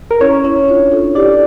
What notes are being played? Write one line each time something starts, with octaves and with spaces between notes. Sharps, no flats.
A#4
C#4 E4 C#5
C#4 E4
D4 F4
F4 A4
E4 G4 D5